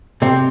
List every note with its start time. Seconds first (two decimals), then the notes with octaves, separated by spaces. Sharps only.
0.22 C3 C4